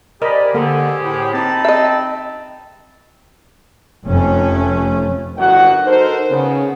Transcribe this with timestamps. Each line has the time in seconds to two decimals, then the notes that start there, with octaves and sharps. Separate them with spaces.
0.22 G4 G#4 A#4 C5 D5 D#5 B5
0.55 D3 A#3 A4
1.02 A2
1.33 C4 D#4 A5 B5
1.65 D#5 E5
4.06 F1 F2 A3 C#4
5.37 G1 F#2 D#3 F#4 F#5
5.85 D#4 F#4 A4 A#4 C5
6.31 C#3 B3